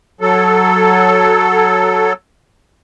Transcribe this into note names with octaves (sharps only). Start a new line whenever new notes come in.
F#3 A4